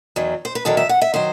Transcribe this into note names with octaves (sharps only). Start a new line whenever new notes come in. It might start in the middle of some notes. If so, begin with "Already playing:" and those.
E2 D#3 F#3
C5
B4
E2 D#3 F#3 A4
E5
F#5
E5
D#3 F#3 C5